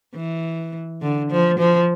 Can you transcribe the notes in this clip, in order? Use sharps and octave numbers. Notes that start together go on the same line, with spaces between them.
E3
D3
F3
F3